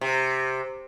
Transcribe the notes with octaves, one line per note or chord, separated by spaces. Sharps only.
C3